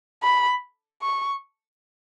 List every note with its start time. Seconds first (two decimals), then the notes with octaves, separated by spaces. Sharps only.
0.24 B5
1.03 C#6